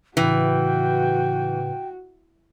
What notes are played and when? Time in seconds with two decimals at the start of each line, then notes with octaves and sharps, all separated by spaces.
0.17 A2 C#3 E3 F#4 B4 G5